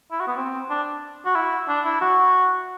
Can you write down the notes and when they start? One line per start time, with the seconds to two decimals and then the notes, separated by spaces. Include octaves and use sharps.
0.11 E4
0.20 F#4
0.27 B3
0.37 C4
0.70 D4
1.26 F#4
1.35 E4
1.68 D4
1.85 E4
2.01 F#4